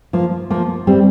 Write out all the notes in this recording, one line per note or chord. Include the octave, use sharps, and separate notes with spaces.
F3 A#3
F3 A#3
G3 C4